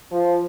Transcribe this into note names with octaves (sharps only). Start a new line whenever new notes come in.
F3